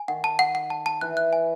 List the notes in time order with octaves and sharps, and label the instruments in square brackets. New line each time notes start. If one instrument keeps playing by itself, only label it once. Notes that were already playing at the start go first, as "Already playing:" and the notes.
Already playing: [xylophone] G#5
[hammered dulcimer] D#3 [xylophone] F#5
[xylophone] A5
F#5
F#5
A5
A5
[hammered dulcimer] E3 [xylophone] F#6
[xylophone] F#6
G#5